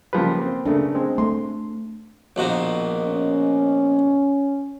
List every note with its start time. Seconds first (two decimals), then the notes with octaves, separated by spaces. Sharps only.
0.13 C#3 F3 G3 A#3 B4
0.41 C4
0.65 C#3 A3 D4 A#4
0.95 G#3 C4
1.18 A3 C6
2.36 A#1 B2 D#3
3.05 C#4